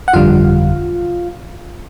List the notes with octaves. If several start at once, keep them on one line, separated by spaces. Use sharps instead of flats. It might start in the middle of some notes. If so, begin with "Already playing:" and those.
F#5
G1 F2 D3 G3 F4 F5